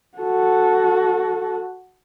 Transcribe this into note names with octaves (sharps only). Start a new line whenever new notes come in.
F#4 A4